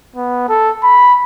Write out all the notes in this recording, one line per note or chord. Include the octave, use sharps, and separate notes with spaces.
B3
A4
B5